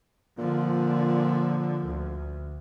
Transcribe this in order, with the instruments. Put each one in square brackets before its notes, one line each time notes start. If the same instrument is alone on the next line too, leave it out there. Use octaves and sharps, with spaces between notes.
[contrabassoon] A#2 [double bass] D3 F3
[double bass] D2